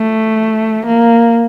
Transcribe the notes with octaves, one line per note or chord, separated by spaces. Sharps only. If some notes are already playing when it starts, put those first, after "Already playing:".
Already playing: A3
A#3